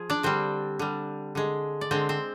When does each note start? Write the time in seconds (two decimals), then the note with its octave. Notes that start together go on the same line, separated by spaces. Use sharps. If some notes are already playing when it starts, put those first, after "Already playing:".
Already playing: F3 G#4
0.10 D4 D5
0.23 D3 G3 C4 C5
0.79 D3 G3
1.35 D3 G#3
1.81 D5
1.91 D3 G#3 C4 C5
2.09 C4 C5